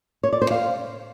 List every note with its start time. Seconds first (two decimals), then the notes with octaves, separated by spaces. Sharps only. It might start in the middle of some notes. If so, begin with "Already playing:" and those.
0.23 C#5
0.32 D5
0.42 C5
0.51 F5